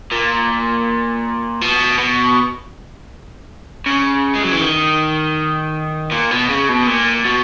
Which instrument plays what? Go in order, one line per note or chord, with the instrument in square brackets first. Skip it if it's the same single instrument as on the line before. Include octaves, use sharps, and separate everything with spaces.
[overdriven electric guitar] A#2
B2
B2
C#3
G#3
F#3
E3
D#3
A#2
B2
C#3
B2
A#2
B2